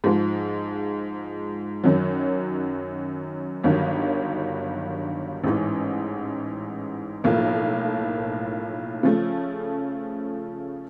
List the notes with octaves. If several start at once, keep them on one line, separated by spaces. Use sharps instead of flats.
G#2 F3 G#3
F#2 D#3 F#3
G1 G2 D#3 F#3
A1 G#2 E3
B1 A2 F3 A#3
C#3 F3 A3